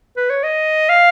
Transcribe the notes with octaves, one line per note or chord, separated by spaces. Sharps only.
B4
C#5
D#5
F5